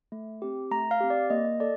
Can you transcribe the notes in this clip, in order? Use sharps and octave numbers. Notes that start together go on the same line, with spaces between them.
A3
C4 G4
A3 A#5
F5
C4 G4
D5
A#3 D#5
D#5
A4 D5